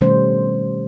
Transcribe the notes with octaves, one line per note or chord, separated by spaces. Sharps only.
B2 D#3 G3 A3 C#4 C5